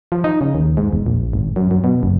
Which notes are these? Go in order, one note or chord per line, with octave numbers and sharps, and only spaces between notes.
F3
D#4
C#3
D#2
G#2
E1
A#1
G#1
F#2
F#2
B2
F#1